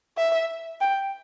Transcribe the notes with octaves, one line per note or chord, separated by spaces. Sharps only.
E5
G5